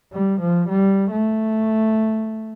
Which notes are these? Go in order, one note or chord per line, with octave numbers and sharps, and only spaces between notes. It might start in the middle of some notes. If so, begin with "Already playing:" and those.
G3
F3
G3
A3